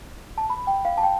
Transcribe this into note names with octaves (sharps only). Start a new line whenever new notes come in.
A5
B5
G5
F5
A5
G5